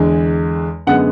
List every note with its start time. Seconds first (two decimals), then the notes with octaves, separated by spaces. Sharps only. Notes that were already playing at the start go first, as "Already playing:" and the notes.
Already playing: E2 D3 G#3
0.87 F#2 D3 G#3 B3 F#5